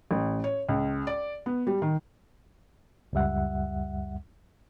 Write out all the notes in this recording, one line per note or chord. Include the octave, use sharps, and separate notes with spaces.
A1
C#5
C#2
D5
B3
G3
D#3
C#2 F#2 G3 E5 F#5